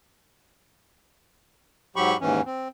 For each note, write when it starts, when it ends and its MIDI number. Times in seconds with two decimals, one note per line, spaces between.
1.96 2.17 44
1.96 2.17 54
1.96 2.17 67
1.96 2.17 83
1.96 2.17 85
2.21 2.41 39
2.21 2.41 44
2.21 2.41 52
2.21 2.41 61
2.45 2.68 60